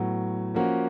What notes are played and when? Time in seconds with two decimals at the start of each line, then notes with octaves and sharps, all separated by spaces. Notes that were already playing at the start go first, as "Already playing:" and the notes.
Already playing: A2 F#3 B3
0.54 F3 A#3 C#4 F#4 A#4